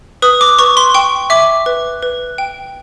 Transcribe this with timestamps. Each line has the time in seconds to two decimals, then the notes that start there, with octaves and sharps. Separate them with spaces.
0.22 B4 D#6
0.41 D6
0.59 B4 C#6
0.77 C6
0.94 G5 C#6
1.30 E5 D6
1.66 B4
2.02 B4
2.38 G5